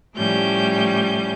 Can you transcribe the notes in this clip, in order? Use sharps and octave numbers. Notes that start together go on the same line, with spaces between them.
A2 F3 G3 C#4 G6